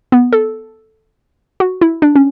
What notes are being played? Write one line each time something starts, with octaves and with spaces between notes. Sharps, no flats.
B3
A4
F#4
E4
D4
C#4